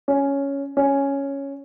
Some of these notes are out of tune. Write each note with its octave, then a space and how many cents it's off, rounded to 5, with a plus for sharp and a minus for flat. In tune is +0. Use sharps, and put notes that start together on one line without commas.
C#4 +5
C#4 +0